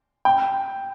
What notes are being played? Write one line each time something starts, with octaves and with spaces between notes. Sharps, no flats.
G5